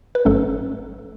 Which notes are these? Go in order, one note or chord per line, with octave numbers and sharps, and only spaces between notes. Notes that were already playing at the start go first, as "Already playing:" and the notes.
B4
G#1 G#2 F#3 A3 C#4 A4